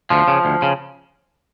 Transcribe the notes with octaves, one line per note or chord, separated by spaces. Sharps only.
D2 F3
C#3
D2
C#3